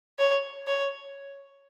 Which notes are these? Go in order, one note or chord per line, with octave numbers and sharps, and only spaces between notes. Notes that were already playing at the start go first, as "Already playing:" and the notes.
C#5
C#5